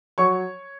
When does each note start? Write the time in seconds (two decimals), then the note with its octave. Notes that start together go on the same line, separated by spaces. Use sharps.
0.18 F#3 C#5 C#6